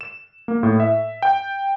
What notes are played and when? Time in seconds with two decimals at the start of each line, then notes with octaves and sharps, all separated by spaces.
0.01 E7
0.48 A#3
0.63 A2
0.80 E5
1.22 G5